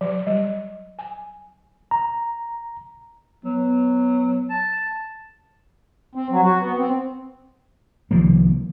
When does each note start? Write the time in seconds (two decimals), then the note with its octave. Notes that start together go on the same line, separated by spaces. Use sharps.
0.01 F#3
0.27 G3
0.99 G#5
1.91 A#5
3.45 F#3 B3
4.50 A5
6.15 C4
6.32 F#3
6.44 F#4
6.60 B3
6.78 C4
8.11 C2 D#3 F3 A#3